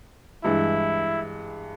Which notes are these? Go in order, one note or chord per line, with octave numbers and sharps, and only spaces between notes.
G2 E3 G#3 E4